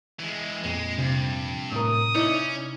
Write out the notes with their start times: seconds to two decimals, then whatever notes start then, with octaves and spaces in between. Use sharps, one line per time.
0.19 E3 G#3
0.64 F2 A#2 G#3
0.99 G2 C3
1.72 A2 A#4 D#6
2.15 C#4 D#4 E4 D5